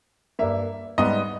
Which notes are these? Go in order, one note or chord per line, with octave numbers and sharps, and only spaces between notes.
G2 G3 A#3 E5
G#2 G3 B3 D#5